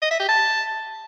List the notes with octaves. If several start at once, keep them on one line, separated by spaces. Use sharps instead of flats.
D#5
E5
G4
A5